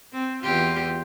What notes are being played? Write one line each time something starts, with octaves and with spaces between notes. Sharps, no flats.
C4
E2 F4 G4